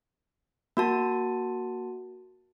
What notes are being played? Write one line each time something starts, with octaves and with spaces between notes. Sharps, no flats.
A#3 F#4 A5